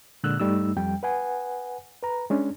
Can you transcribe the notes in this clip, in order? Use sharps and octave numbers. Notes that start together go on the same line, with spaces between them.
A#2 D3 G#3 E6 F#6
G2 G3 A3 D#4 E6
F2 G3 G5
B4 F#5 G#5
B4 A#5
G#3 C#4 D4